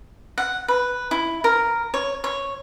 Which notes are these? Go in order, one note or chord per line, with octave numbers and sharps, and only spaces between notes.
F#5
B4
E4
A#4
C#5
C#5